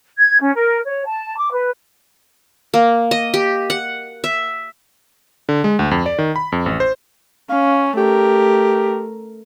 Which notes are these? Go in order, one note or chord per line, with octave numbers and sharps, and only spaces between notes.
G#6
C#4
A#4
C#5
A5
D6
B4
A#3
D#5
G4
F#5
E5
D3
G#3
D2
F2
D5
D#3
B5
F2
A1
C5
C#4 F5
A3 G4 A#4